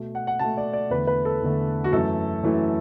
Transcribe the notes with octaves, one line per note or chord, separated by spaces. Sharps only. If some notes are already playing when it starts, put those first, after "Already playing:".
Already playing: B2 A3
F#5
F#5
B2 A3 A5
D5
D5
E2 D3 A3 B4
B4
A4
E2 D3 A3
F#4
F#2 E3 A3 A4
F#2 E3 A3